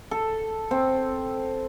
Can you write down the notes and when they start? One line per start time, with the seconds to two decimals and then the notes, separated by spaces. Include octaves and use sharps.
0.11 A4
0.71 C4